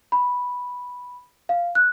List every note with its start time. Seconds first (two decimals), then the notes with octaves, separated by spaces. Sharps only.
0.12 B5
1.49 F5
1.75 F#6